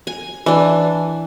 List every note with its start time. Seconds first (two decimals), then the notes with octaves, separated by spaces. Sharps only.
0.07 G#5
0.46 E3 D4